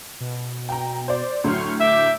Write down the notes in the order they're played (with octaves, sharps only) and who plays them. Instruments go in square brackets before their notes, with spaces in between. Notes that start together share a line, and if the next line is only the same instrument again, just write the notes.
[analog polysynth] B2
[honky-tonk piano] G5 A#5
C5 D5
[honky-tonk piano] D2 A2 F#3 [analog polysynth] C6 C#6 F6
[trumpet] E5 [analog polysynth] D6 G6